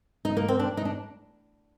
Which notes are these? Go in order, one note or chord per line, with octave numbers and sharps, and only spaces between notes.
D#4
A#3
C4
D4
D#4
D4